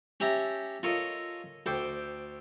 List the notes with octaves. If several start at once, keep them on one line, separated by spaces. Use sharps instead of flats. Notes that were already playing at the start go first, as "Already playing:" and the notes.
C#4 G4 E5 A5 A#5
F4 A4 A#4 C#5 D#5
D2 A4 C5 G5 D6